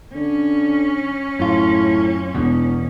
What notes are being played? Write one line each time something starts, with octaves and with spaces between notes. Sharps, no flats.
D3 C#4
F#2 A2 F4
E1 E2 B2